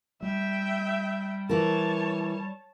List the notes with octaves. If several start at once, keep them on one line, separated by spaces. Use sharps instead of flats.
G3 E5 G5
E3 A#4 C#5 A5